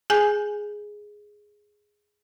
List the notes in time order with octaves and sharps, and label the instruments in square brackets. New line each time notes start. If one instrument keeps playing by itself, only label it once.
[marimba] G#4 G#5 G6